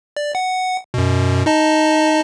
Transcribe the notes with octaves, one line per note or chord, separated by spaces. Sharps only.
D5
F#5
F#2 B2
D#4 D#5 A5